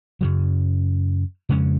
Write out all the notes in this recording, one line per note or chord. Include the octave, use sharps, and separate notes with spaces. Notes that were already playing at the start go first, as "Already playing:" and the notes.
F#2 C#3 F#3
F2 C#3 G#3 C#4